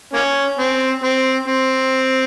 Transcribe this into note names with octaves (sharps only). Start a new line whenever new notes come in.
A#3 C#4
C4
C4
C4